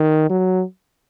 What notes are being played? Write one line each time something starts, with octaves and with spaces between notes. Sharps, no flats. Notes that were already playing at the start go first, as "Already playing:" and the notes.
Already playing: D#3
F#3